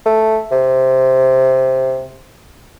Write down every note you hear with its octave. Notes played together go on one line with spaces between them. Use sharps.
A3
C3